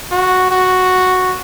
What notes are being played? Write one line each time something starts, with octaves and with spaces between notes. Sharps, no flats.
F#4
F#4